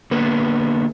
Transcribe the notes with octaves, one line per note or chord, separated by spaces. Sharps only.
D3 A#3 B3 B4